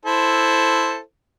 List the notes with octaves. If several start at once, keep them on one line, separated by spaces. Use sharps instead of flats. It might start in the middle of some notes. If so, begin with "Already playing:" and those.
E4 A4 C5